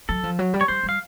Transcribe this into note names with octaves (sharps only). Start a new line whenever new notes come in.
F#3 A4
F3
F#3
G3
C#5
G3 C5
G3
F5